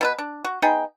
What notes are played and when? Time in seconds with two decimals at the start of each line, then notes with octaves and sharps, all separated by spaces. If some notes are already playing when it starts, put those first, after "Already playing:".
0.01 B2 E4 B4
0.19 D4
0.44 F#4
0.62 B3 D#4 G#4 G5